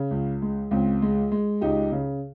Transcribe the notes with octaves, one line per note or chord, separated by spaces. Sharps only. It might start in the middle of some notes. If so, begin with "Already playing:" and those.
Already playing: C#3
C#2
G#3
C#2 C4
G#3
G#3
C#2 D#4 G4
C#3